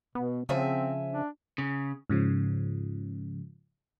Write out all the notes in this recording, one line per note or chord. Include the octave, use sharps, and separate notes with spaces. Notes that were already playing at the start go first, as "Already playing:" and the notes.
B2 B3
C#3 F3 C4 E5 G#5
D4
C#3
G#2 C#3 F3